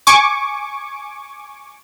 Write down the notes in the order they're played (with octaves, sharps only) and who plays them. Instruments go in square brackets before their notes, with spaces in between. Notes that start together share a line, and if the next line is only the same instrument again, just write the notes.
[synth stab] G#5 C#6 D6